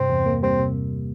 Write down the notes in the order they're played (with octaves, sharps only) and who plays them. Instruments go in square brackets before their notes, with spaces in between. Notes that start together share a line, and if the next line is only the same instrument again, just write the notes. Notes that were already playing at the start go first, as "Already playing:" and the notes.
Already playing: [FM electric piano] G2 C3 [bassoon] C4
[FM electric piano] E2
A#3
[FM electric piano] G3 [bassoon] C4
[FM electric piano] C3